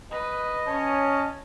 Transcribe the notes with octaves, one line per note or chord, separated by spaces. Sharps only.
B4 D#5
C#4 C#5 A5